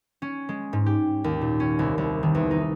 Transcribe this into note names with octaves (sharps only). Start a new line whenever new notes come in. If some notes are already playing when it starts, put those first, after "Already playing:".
C#4
G#3
G#2
G4
D#2
A#2
C#4
C2
C2
D#3
E2
D#4